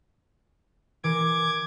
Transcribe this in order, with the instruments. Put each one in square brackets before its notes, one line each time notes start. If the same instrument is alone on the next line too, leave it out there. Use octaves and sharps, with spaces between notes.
[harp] E3 A#4 [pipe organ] D6 G#6